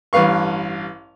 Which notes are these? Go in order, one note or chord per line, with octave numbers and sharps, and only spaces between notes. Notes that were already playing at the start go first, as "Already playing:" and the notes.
A1 G2 B4 F5 C#6